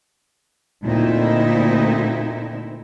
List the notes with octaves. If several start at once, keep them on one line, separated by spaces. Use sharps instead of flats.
D2 A#2 C4 D#4 E4